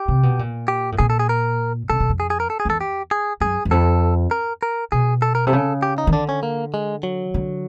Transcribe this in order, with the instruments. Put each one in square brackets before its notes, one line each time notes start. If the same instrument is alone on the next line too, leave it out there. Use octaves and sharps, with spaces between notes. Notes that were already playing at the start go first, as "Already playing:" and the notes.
Already playing: [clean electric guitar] G4
[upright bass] C3
B2
A#2
[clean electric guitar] G4
[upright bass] A2
[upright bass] A#2 [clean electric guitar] G#4
[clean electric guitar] A4
G#4
A#4
[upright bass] C3 [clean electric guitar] A4
[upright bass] B2
F2
[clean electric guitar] G#4
G#4
A#4
A4
G#4
[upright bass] E2 [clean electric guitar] A4
[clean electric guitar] G4
G#4
[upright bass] F#2 [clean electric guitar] G#4
[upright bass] E2
[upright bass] F2 [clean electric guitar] A4
[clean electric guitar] A#4
A#4
[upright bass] B2 [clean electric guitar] G#4
[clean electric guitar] A4
A#4
[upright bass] C3 [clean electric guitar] A4
[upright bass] C#3
[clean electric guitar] G4
D#4
[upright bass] D#3
[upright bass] D3 [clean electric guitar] D4
[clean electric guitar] C#4
A#3
G#3
F#3
[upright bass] D3